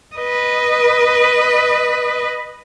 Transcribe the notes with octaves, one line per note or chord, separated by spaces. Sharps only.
B4 D#5